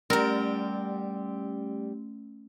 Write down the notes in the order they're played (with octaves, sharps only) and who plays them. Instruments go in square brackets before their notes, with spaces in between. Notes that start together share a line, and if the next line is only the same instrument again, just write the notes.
[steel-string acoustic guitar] G3 G4 [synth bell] A3 C#4 [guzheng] A#4